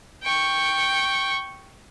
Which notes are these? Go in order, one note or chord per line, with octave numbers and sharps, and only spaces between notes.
G5 C#6